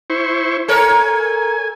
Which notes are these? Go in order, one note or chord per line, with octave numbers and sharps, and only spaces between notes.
E4 C5 C#6
A4 A#4 C#5 G#5